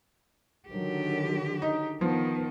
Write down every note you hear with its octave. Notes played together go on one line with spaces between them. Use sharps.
D3 D#3 F#3 G4
D#4
D#3 F3 B3